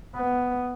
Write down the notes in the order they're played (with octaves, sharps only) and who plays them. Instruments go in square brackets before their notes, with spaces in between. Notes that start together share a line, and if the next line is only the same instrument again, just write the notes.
[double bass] B3